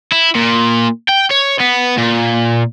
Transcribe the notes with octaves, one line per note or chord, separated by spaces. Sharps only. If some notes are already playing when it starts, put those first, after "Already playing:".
E4
A#2
G5
C#5
B3
A#2